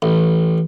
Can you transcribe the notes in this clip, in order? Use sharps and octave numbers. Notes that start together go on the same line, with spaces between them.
A1